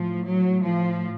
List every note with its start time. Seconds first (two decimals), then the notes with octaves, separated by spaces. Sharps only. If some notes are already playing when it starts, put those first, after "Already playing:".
Already playing: A2 F3
0.25 F#3
0.63 F3